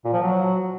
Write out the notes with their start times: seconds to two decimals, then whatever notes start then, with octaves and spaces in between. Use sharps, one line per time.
0.05 A#2
0.13 F3
0.22 F#3